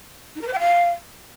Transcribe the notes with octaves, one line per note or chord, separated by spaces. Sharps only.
D#4
A#4
C5
G5
F5